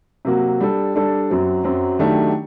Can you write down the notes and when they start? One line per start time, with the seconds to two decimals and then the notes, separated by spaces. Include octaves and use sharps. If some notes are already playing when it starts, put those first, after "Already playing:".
0.25 C3 F#3 A#3 F#4
0.61 G3 D4 A4
0.95 G3 D4 A4
1.30 F#2 F#3 C4
1.64 F#2 F#3 C4
1.99 D#3 F#3 A3 D4 G4